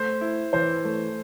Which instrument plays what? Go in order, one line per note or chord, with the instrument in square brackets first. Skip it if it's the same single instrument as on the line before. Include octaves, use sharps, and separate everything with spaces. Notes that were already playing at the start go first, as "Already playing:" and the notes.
Already playing: [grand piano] A3 [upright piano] C5
[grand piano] E4
[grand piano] E3 [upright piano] C5
[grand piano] A3